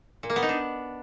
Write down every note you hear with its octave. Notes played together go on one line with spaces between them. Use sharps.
A#2
A#3
B3
D#4
D4